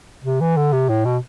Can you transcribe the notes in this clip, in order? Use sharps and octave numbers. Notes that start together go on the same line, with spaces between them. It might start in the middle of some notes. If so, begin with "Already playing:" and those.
C3
E3
D3
C3
A2
B2